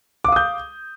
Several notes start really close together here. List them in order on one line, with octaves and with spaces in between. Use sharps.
D6 F5 D#6 G6